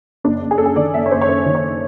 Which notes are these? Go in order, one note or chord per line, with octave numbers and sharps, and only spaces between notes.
F#1 D4
F#1
G#4
F#2 A4
G#4
D#3 D5
F#1 E5
C#5
F#1 C5
C#5
F#2 C5
D#3
C#5